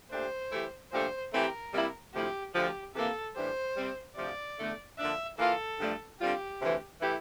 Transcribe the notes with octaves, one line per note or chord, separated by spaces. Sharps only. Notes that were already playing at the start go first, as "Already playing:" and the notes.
A#2 A3 D4 G4 C5
E3 A3 E4 G4
A#2 F3 A3 D4 G4 C5
E3 A3 C4 G4 A#4
C3 G3 A#3 E4
D2 C3 F3 A3 E4 G4
D2 D3 F3 G4
C3 E3 A#3 A4
A2 E3 G3 D4 G4 C5
C3 G3 C4
D2 C3 F3 D5
E2 D3 A3
D3 F3 A#3 D4 E5
E3 A#3 F4 A4
G2 D3 F3 A3 D4
D3 G3 C4 F4 G4
D2 C3 E3
E3 A3 E4 G4